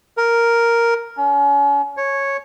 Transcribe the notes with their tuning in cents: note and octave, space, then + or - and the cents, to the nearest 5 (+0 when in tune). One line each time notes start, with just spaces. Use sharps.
A#4 +0
C#4 +35
C#5 -10